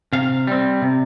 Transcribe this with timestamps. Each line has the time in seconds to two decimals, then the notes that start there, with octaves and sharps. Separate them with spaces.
0.13 C3 F5
0.47 G3 C4
0.82 C3